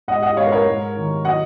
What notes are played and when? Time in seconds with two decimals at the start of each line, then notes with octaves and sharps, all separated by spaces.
0.08 G#2 D#5 F#5
0.22 D#5 F#5
0.37 G#2 C#5 F5
0.47 B4
0.52 A#4 C#5
0.66 G#2
0.96 D#3
1.25 F#3 D#5 F#5